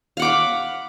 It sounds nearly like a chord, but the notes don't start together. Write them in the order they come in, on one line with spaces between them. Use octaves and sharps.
F5 F#5 D6 B5